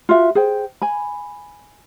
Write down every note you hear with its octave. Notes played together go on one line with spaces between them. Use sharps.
F4 F#4 E5
G#4 C5 G5
G#5 B5